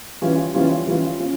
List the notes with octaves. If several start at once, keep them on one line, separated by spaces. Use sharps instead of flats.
E3 G3 C#4 F4
E3 G3 C#4 F4
E3 G3 C#4 F4
C#4 F4